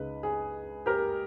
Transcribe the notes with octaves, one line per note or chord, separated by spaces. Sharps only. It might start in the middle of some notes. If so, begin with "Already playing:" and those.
Already playing: C#2 C#3 G#3 D#4 B4
G#4
G4 A#4